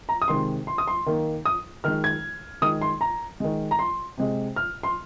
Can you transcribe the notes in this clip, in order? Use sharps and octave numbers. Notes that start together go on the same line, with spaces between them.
A#5
D#6
C3 D#3 G#3 C6
C6
D#6
C6
D#3 A#3
D#6
D#3 G#3 F6
G#6
D#3 G#3 D#6
C6
A#5
D#3 G#3
A#5
C6
C3 G#3
F6
C6